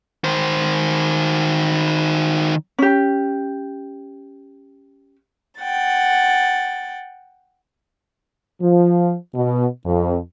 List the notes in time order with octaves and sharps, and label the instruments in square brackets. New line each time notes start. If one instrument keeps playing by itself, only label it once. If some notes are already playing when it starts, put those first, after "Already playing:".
[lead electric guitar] D#3 C5
[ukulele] C#4 G4
[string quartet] F#5 G5 A6
[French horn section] F3
B2
F2